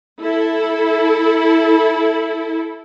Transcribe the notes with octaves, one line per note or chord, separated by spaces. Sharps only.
E4 A4